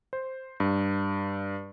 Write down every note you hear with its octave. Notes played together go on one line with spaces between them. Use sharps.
C5
G2